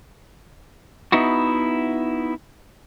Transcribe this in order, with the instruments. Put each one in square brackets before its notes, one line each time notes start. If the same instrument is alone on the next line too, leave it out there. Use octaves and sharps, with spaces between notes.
[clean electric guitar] B3 D#4 E4 F#4